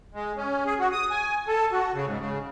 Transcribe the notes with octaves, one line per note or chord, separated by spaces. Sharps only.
G#3
C#4
G#4
F#4
D#6
G#5
A4
F#4
C#3
G#2
C#3